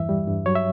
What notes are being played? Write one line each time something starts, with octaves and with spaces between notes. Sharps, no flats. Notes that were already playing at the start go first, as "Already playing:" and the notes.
Already playing: E2 G2 E3 E5
G3
G2
F#3 C#5
E5